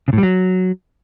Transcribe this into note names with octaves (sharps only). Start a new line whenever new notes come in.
C#3
A2
G3
F#3